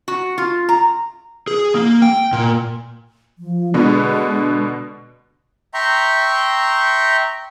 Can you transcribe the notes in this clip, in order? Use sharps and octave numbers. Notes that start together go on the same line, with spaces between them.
F#4
F4
A#5
G#4
A#3
G5
A#2
F3
B2 D3 G#3 B3
E5 G5 A#5 C6 C#6